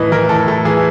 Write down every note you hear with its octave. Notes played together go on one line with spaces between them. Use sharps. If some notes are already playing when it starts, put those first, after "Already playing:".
Already playing: A2 E3 D#5
E3 A#4
A2 A4
A2 A4
E3 G#4